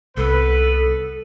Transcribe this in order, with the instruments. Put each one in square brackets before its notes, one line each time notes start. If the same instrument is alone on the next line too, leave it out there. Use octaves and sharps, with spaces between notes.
[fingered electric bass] C2 [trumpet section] B3 B4 [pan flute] A4